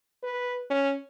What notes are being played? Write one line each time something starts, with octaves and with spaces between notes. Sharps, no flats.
B4
C#4